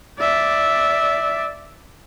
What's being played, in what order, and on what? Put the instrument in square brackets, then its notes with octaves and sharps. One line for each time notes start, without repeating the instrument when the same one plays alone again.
[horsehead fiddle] D5 E5